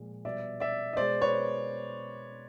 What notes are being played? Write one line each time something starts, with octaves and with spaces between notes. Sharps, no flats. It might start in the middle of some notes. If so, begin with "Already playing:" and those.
Already playing: A#2 F3 G#3
B2 G3 D5 E5
D5 E5
D#5
B2 G#3 C5 D5
B4 C#5